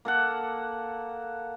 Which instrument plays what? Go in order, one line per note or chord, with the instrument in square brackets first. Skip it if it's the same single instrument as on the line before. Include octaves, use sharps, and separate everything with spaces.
[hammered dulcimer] A#3 A4 F#5